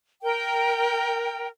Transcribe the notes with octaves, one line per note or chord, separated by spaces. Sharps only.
A#4 G5